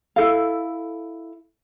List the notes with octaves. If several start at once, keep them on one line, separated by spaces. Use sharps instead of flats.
E4 A4 F5